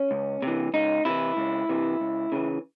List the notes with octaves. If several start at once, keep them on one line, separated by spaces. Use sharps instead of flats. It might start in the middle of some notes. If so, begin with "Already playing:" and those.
Already playing: C#4
C#2
C3 E3
C#2 D#4
C3 E3 E4
C#2
C3 E3
C#2
C#3 E3